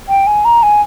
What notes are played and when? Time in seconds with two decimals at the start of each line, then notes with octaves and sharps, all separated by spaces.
0.09 G5
0.27 G#5
0.45 A#5
0.63 G#5